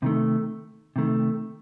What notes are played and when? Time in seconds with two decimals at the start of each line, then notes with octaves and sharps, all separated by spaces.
0.03 C3 D#3 A3
0.96 C3 D#3 A3